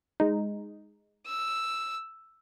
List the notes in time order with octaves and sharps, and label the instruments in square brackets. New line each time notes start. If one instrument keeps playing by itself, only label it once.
[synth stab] G#3 D#4
[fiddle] E6